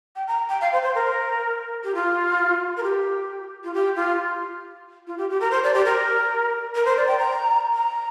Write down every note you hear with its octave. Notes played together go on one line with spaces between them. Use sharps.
G5
A#5
G5
F5
C5
C5
A#4
G4
F4
A#4
G4
F4
G4
F4
F4
G4
G4
A#4
C5
D5
G4
A#4
A#4
C5
D5
G5
A#5
A#5